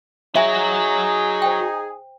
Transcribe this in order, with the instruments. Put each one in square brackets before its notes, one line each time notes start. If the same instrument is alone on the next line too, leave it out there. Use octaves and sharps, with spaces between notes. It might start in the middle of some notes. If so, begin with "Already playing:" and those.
[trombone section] D#4 G#4 [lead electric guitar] F#4 C#5 [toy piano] E5 G#5
[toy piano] C5 G5